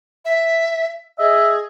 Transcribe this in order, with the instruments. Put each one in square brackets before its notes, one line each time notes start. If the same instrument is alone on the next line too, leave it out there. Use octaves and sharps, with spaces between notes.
[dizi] E5
[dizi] G#4 [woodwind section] D#5 E5